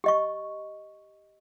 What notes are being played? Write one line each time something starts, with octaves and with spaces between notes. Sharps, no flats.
G4 D#5 C#6